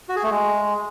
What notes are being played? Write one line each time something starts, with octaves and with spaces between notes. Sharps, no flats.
F#4
G#4
A3
G#3